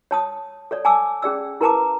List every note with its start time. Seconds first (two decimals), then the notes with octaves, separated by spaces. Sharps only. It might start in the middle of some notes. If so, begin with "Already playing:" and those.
0.11 C#5 A5 D#6
0.71 A4 C#5 D5
0.85 G#5 A5 D6 E6
1.22 C#4 G#4 D5 E6
1.61 E4 A#4 B4 A5 A#5 D6